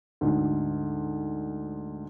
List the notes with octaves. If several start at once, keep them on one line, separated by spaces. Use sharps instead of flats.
D2 G#2